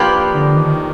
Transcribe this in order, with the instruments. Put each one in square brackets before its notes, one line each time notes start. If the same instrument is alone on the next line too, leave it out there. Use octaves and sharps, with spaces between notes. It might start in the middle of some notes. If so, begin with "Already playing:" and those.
Already playing: [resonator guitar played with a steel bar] F3 A#3 D4 G4 B4
[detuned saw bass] D3
D#3